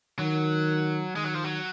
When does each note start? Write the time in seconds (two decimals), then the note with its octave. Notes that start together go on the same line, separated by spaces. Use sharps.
0.19 D#3 F#3
1.16 D#3 G#3
1.24 F#3
1.34 F3
1.44 F#3